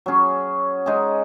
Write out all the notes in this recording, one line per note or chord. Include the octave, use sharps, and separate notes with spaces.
F#3 C#4 G#4
G#3 D#4 G#4